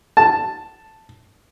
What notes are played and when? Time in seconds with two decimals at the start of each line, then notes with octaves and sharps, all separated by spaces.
0.17 A5